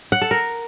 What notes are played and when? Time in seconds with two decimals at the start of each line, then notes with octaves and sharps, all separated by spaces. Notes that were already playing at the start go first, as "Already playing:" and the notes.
0.12 F#5
0.21 A4
0.31 A#4